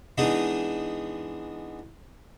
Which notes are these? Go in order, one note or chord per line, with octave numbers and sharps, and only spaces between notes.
E3 G#3 B3 D4 D#4